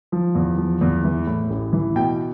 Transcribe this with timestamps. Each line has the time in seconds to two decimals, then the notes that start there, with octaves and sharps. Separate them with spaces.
0.12 F3
0.35 E2
0.58 F3
0.81 E2
1.04 E3
1.27 A2
1.50 A1
1.73 E3
1.95 B2 G5